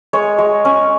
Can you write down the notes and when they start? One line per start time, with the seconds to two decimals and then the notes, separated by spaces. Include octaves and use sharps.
0.13 G#3 C#5
0.38 G#3
0.65 C#4